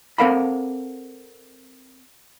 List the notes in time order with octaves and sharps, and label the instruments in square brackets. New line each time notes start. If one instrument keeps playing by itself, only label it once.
[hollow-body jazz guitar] C4 A4 A#4 F5 F#5 B5